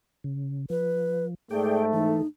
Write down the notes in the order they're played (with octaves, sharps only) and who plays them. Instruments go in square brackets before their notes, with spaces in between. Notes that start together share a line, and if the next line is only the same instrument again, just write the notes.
[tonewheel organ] C#3
[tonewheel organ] F3 [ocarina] B4
[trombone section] G#2 A3 [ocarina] G#4 [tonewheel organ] D5 G5
[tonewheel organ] E3 A4 [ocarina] D#4